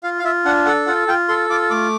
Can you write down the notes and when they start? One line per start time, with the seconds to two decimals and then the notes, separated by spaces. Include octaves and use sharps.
0.03 F4 F5
0.19 F5
0.24 F4 E5
0.45 D4 F#5
0.66 A4 F#5
0.86 F4 F#5
1.08 F4 G5
1.28 A4 C6
1.50 F4 D6
1.70 A3 D6